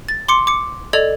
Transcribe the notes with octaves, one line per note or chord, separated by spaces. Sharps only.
A6
C6 D6 C#7
D6 C#7
A4 D5 D#5 G#6 F7